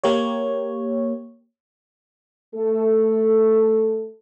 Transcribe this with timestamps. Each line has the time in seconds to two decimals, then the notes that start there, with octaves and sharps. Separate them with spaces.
0.04 A#3 G4 C#5
2.55 A3 A4